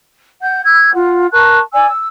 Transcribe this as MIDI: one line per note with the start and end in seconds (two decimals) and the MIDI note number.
0.42 0.61 78
0.42 0.61 91
0.64 0.94 88
0.64 0.94 92
0.94 1.27 65
0.94 1.27 78
1.31 1.58 70
1.31 1.58 81
1.31 1.58 85
1.31 1.58 90
1.73 1.87 74
1.73 1.87 80
1.73 1.87 88
1.88 2.07 88